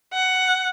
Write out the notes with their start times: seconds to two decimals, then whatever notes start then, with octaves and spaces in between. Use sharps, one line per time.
0.13 F#5